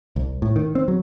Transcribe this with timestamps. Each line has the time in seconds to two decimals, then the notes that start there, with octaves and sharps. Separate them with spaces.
0.16 C2
0.42 A2
0.56 D#3
0.75 C4
0.88 F#3